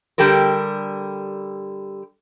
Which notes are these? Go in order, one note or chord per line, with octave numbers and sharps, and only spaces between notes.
D3 G3 G4 A4 A#4